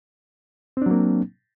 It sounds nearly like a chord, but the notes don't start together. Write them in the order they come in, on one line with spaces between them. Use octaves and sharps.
C4 D4 F#3 A#3